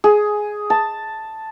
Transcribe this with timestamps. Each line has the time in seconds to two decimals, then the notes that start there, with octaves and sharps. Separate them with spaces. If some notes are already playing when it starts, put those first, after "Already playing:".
0.04 G#4
0.70 A5